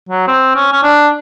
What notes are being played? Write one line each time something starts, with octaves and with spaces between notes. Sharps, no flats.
F#3
C4
C#4
C#4
D4